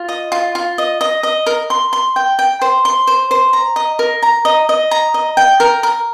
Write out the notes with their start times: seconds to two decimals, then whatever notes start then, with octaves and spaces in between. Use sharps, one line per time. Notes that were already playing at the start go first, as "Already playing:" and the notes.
Already playing: F4
0.09 D#5
0.32 F4
0.55 F4
0.78 D#5
1.01 D#5
1.23 D#5
1.46 A#4
1.70 C6
1.93 C6
2.16 G5
2.39 G5
2.62 C5
2.85 C6
3.07 C5
3.31 C5
3.53 A#5
3.76 D#5
3.99 A#4
4.23 A#5
4.45 D#5
4.69 D#5
4.91 A#5
5.14 D#5
5.37 G5
5.60 A#4
5.83 A#4